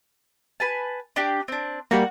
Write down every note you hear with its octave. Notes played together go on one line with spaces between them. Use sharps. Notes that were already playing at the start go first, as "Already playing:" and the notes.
B4 G#5 A5
D4 G4 G5
C4 D4
G3 A#3 F#4 F#5